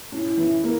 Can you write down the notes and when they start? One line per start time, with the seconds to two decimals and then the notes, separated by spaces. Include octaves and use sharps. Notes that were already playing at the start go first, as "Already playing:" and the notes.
0.12 C#4 E4
0.38 E3
0.64 A#3